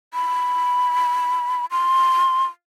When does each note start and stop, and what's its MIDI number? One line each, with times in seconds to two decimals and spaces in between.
0.14 1.65 83
1.71 2.44 84